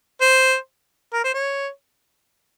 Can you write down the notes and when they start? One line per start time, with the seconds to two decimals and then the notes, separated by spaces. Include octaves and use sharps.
0.21 C5
1.13 A#4
1.24 C5
1.34 C#5